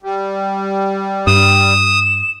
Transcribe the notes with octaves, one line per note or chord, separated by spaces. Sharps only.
G3
G2 D#6 E7